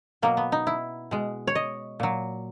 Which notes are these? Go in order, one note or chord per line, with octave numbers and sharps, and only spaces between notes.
B2 F#3 A#3
B3
D#4
E4
B2 G#3
C#5
D#5
A#2 F#3